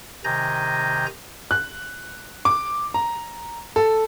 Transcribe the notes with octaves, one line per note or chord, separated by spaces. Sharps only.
C3 D#3 G#5 A#5 G6 A#6
F#6
D6
A#5
A4